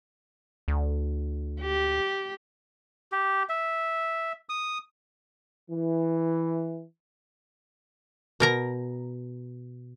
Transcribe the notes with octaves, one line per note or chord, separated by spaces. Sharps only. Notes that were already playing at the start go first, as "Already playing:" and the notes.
D2
G4
G4
E5
D#6
E3
B2 A#4 A#5